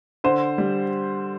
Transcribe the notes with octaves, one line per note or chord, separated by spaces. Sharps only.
D3 C5
G3